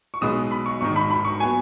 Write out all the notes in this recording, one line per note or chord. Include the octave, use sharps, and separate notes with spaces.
C#6
B1 B2 G#3 B3 D#6
B5
C#6
G#1 G#2 D#3 C#6
B5
B5
C#6
F#3 B3 G#5